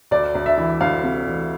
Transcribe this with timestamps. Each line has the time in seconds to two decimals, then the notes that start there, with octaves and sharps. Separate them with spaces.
0.11 D2 D5
0.35 D2
0.46 E5
0.58 E3
0.81 D2 F5
1.03 C3
1.27 E3